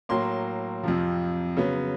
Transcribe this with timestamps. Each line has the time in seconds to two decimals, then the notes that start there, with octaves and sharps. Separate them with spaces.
0.09 A2 F#3 A#3 C6
0.83 F2 C3 F3
1.57 C#3 F#3 B3